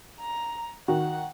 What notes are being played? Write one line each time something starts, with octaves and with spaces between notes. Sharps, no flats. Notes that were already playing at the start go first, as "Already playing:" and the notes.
A#5
D#3 F#4 F#5